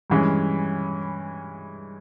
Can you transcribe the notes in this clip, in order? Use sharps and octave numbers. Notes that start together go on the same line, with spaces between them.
G2 E3 G#3 C#4